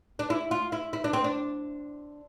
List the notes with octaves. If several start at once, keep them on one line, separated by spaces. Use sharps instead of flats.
D4
E4
F4
E4
E4
D4
C4
D4